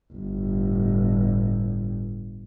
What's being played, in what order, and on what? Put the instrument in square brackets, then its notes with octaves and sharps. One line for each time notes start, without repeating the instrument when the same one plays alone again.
[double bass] G1 A2